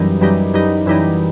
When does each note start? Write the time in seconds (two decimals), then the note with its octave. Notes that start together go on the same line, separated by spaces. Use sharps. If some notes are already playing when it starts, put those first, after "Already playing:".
Already playing: F#2 E3 G3 D#4
0.21 F#2 E3 G3 D#4
0.54 F#2 E3 G3 D#4
0.86 F#2 E3 G3 D#4